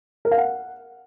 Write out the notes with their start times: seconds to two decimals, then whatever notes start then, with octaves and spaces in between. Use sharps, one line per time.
0.25 A#4
0.31 F5
0.38 F#5